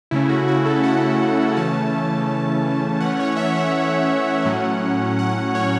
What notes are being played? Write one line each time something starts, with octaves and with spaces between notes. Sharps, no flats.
C#3 A3 C#4 E4
F#4
F#4
F#4
A4
F#5
C#3 E3 A3 C#4 A5
E3 A3 C#4 F#5
C#5
E5
F#5
A2 F#3 C#4
F#5
C#5